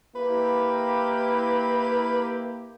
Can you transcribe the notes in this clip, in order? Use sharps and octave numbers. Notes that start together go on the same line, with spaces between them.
A#3 E4 G4 B4